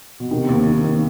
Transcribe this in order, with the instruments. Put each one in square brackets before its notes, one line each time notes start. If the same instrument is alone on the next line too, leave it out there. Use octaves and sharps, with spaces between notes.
[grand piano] B2
[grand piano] C3 [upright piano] D#3
[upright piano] D#2
D#3
D#2